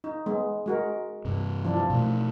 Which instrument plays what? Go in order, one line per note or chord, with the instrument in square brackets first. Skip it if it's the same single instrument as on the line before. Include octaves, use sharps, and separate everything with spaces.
[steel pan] D#4
G#3 B3
G#3 F#4 A#4
[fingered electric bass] G2 C3
[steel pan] F3 D4 E4
[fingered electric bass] B2 A3